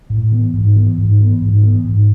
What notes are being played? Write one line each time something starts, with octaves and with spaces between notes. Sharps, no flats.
A2
E3 B3
G#2
E3 B3
G#2
E3 B3
G#2
E3 B3
G#2